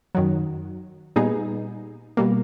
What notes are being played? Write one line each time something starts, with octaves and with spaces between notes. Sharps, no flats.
F#2 D#3 F#3
A#2 G3 B3 D#4 G#4
B2 G3 A#3